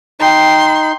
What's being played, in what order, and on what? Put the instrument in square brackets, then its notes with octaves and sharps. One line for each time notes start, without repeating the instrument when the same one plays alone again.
[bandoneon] D#4 [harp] G5 A5 [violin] C6